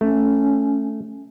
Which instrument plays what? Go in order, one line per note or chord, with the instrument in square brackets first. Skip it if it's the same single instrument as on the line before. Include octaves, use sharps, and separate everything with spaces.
[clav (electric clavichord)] A3 [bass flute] C#4